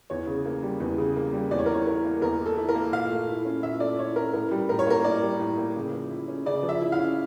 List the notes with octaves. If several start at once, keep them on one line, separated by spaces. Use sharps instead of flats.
E2 C#5
C#3
A#3
G3
E2
C#3
A#3
G3
E2 D5
C#5
A#4
E3 C#5
E4 A#4
A#3
E2 A#4
E3
A4
E4
A#4
A#3
A#2 F5
A3
E4
C#4
A#2 E5
A3 D5
E4 C#5
C#4 A#4
A2 A#4
G3
A2 A#4
C#5
A#3 A#4
A2 D5
G3
A2
A#3
C#3
F3
E4
C#4
C#3 D5
F3
E5
E4
F5
C#4